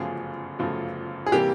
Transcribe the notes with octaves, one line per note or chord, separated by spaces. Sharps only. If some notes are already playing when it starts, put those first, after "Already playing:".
Already playing: G1 F#2 C#3 F3 A3 G#4
G1 F#2 C#3 F3 A3
G#4
C3 E3 G3 A#3 G4